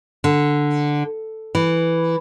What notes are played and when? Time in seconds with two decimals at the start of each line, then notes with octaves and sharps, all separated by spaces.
0.24 D3
1.55 E3